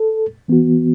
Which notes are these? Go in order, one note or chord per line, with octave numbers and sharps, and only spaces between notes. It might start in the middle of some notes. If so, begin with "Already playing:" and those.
Already playing: A4
E3 B3 F#4